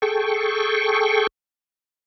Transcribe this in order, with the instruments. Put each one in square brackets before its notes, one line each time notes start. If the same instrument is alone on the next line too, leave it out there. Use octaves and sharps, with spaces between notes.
[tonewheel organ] G#4 A4 G5 C#6